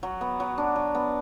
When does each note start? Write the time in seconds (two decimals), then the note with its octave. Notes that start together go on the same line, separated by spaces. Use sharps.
0.03 F#3
0.21 B3
0.40 F#3
0.58 D4
0.76 F#3
0.95 B3